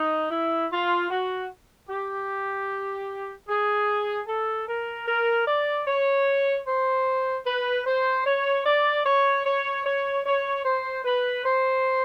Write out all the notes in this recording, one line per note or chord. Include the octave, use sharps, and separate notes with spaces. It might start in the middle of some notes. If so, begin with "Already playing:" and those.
Already playing: D#4
E4
F4
F#4
G4
G#4
A4
A#4
A#4
D5
C#5
C5
B4
C5
C#5
D5
C#5
C#5
C#5
C#5
C5
B4
C5